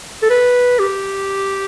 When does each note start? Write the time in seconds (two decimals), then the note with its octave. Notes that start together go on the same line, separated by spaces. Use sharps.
0.23 A4
0.30 B4
0.79 G4